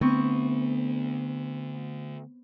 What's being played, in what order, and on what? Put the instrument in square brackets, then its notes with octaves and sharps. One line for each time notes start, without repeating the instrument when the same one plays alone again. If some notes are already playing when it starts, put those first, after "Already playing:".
[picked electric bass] D3 A3 [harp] B3 C4 C#6